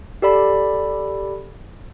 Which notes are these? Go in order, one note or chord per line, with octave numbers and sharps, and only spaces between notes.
G4 A4 D5 B5